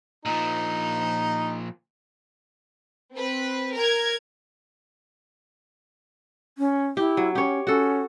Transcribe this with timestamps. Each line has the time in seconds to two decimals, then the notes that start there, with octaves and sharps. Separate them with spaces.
0.25 A#2 F3 D#4
3.14 C4 B4
3.75 A#4 G#6
6.58 C#4
6.97 E4 G4
7.17 F#3
7.35 C#4 G4 C#5
7.67 C#4 F#4 A4